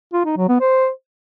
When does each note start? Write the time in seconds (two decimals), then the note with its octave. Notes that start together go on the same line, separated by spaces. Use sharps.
0.13 F4
0.25 D#4
0.37 F#3
0.49 B3
0.61 C5